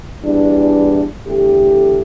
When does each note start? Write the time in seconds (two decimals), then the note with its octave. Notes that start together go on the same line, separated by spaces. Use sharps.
0.23 E2 E3 G3 D4
1.25 E2 D3 A3 G4